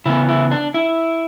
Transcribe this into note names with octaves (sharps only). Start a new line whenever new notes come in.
C#3 E3 B3 E4
E4
D4
E4